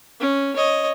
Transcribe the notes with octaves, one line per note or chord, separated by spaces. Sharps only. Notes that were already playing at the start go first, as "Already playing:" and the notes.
C#4
C#5 D#5